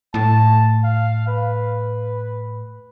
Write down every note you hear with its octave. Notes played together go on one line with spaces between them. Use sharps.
A2 A5
F5
B4